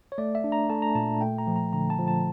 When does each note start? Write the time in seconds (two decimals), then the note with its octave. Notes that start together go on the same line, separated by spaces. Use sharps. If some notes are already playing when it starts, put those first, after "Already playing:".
0.12 C#5
0.18 A3 D5
0.35 E5
0.44 D4
0.52 A#5
0.70 A3 A5
0.82 A#5
0.95 A#2 A5
1.21 A3 G5
1.38 A#5
1.47 F3
1.56 A#5
1.73 D3 A#5
1.90 A5
1.99 F3
2.08 A5